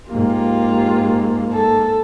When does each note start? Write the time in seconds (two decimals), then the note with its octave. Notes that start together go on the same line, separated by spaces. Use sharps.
0.10 G#2 A#3 F4 G4
1.53 A4